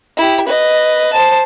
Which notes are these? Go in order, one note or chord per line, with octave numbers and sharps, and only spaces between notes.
E4 G4
B4 D#5
C5 A5